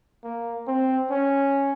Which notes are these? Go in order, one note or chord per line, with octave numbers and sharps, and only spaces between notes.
A#3
C4
C#4